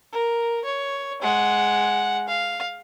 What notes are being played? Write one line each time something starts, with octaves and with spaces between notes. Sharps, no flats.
A#4
C#5
G#3 F#5
F5